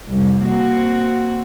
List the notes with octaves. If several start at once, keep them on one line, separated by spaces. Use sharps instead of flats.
C2 F2
A#3 C4 F#4